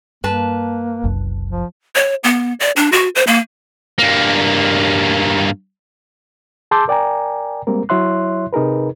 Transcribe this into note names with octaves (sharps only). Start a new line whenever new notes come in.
G2 A#3 B4 A5
F#1 C2 F#2
F3
C#5
B3
D5
D4
F#4
C5
A#3
G2 A#3
G#4 A5 C6 D6 E6 G6
A#4 D5 G5 G#5 A#5
G3 G#3 A#3 C4 A#4
F#3 E4 C#5 E5 C6 F#6
C3 D#4 G#4 A#4 B4